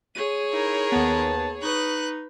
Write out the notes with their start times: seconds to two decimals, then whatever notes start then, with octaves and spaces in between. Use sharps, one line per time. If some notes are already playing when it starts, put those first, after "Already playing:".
0.15 G#4 C#5 D#7
0.53 D#4 E4 A#4
0.92 D#2 B3 A5
1.63 D#4 B4 C#6 D#6 F#6